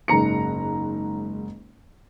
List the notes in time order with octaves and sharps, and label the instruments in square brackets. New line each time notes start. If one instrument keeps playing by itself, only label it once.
[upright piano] F#1 G#2 A#5 C#7